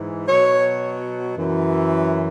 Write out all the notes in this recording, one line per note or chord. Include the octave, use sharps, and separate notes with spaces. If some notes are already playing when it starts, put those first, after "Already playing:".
Already playing: G#2 E3
B2 F#3 C#5
F#2 E3